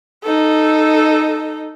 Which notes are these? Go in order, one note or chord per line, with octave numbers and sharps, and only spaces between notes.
D#4 A4